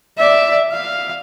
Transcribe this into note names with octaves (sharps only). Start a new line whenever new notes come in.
D5 E5
F5